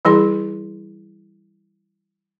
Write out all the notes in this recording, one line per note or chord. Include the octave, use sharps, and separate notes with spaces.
E3 G3 E4 G#4 C6